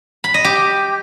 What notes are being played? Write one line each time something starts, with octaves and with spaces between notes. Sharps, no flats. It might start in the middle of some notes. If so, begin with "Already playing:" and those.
B5
D#5
G4